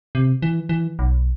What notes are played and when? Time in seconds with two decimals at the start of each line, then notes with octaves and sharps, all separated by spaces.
0.15 C3
0.42 E3
0.69 E3
0.99 B1